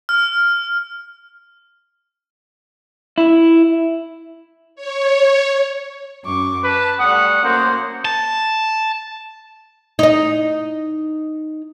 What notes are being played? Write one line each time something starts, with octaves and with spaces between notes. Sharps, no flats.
F6
E4
C#5
F#2 C#6 D6
B4 A5
G3 A3 F#5 D#6
F#2 A#3 C5 F#5
A5
D#4 D#5